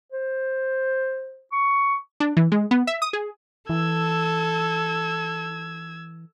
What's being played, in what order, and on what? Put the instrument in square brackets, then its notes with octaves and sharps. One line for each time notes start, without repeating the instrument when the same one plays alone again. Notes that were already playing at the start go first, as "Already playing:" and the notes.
[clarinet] C5
C#6
[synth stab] D4
E3
G#3
B3
E5
D#6
G#4
[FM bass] E3 [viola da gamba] A4 [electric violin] E6 G#6